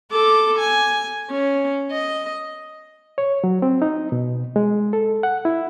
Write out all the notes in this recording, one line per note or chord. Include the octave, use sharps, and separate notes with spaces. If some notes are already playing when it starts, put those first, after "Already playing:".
A4 D6
G#5
C#4
D#5
C#5
F#3
C4
D#4
B2
G#3
A4
F#5
E4